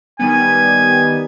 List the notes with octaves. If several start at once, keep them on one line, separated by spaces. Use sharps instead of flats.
D#3 G3 B3 G#5